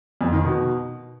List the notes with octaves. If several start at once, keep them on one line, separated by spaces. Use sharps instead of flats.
F2
D#3
B2